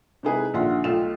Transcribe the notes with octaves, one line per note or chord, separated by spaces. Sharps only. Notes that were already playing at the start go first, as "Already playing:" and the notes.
C3 G#3 D#4 E4 G#4 B4
A#1 D3 D#3 E5 F#5 C6
B1 A3 F4 G5 E7